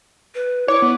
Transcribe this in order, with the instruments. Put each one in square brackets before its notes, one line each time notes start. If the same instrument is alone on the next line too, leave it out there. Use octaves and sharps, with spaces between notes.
[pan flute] B4
[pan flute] E4 [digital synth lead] C#5 [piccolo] D6
[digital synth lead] B3